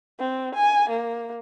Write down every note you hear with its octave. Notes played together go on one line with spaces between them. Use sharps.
C4
G#5
A#3